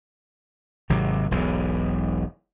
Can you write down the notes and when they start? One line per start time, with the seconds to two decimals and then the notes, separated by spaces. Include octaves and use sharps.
0.90 G#1 C3 F#3
1.31 E1 B1 G#2